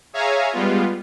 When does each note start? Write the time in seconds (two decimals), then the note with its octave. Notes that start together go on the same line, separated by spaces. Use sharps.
0.13 G#4 C#5 E5 F5 G#5 A#5
0.52 G3 G#3 B3 F4